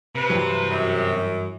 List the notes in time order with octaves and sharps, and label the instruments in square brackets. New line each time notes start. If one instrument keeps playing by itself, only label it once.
[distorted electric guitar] C3 [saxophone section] B4
[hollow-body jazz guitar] G2 E3 F#3
[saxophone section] F#2